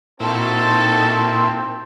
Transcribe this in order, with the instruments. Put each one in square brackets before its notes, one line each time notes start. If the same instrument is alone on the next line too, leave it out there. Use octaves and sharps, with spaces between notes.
[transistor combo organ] A#2 E4 [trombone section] C4 [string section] D#4 F#4 A4 [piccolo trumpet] A5